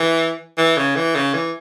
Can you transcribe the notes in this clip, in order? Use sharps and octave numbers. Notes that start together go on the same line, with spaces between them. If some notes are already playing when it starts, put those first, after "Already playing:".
Already playing: E3
E3
C#3
E3
C#3
E3